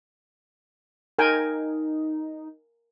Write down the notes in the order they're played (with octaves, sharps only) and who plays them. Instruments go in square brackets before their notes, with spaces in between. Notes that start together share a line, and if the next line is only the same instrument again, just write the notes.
[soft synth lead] D#4 [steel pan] A#4 G5 G#5